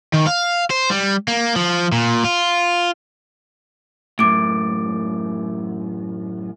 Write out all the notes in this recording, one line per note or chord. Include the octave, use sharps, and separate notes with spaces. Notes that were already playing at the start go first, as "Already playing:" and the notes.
D#3
F5
C5
G3
A#3
F3
A#2
F4
F#2 A2 D6 D7